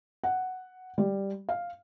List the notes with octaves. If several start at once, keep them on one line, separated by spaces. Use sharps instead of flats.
F#5
G3
F5